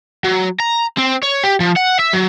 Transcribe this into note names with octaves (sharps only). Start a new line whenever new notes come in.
F#3
A#5
C4
C#5
G4
F3
F#5
E5
F#3